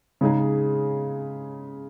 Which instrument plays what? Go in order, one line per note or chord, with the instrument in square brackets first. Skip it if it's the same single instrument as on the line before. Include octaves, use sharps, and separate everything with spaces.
[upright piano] C#3 G#3 D#4 G#4